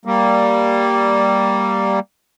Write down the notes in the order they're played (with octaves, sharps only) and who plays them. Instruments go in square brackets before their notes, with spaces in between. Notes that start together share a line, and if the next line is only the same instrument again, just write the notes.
[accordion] G3 A#3